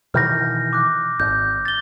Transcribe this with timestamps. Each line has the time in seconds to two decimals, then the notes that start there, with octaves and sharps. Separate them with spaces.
0.14 B2 D#3 E3 F6 G6 A#6
0.73 D6 F#6
1.20 G#1 G6
1.65 A6 G7